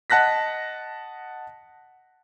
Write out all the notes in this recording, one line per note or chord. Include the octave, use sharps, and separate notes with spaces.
D#5 F#5 A5 F#6 A#6 B6